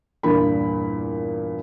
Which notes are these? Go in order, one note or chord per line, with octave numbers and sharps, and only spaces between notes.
E2 G2 A#2 D4 A#4 B5